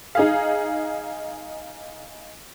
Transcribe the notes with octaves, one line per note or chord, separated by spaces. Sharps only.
D#4 G#4 F5